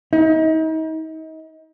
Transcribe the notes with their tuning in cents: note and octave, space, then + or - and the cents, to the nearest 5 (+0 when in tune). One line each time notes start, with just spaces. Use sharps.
D#4 +35